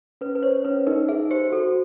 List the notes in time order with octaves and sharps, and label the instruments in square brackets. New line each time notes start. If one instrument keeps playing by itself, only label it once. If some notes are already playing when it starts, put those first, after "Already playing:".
[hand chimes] C#4 [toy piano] B4
[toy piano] B4
[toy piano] C5 [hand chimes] C#5
[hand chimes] C#4 [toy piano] B4
[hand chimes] D#4 [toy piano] A#4
[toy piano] G#4 [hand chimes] E5
[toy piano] G4 [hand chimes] C5
[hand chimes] F#4 [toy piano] A4